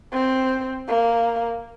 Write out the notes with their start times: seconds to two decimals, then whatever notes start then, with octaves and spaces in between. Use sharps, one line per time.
0.13 C4
0.88 A#3